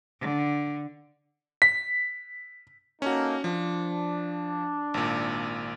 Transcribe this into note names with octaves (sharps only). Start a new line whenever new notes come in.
D3
B6
A#3 C#4 D#4 F#4 A4
F3 D4
G#1 A#2